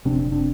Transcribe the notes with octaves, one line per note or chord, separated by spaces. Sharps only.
F#1 F2 C3 C4 D4
C4 D4